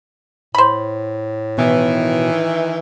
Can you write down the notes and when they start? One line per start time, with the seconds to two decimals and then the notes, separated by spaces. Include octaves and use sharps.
0.55 A2 C5 B5
1.58 B2 D#3 E3